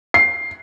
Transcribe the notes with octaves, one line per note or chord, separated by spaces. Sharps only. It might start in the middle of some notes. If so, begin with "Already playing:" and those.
C7